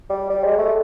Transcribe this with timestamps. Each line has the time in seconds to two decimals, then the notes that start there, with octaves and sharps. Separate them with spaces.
0.10 G3
0.30 G3
0.44 G#3
0.58 A3